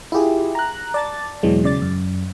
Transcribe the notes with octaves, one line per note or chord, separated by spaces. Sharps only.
E4 F4 G4 G#4
A#5 F#6
D5 A5 A6
E2 B2 E3 F#3 G#3
C#3 D5 A6
F#2